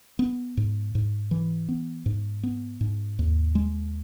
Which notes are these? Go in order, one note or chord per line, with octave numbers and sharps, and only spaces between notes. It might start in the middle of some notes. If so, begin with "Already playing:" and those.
B3
G#2
G#2
E3
B3
G#2
B3
G#2
D#2
G#3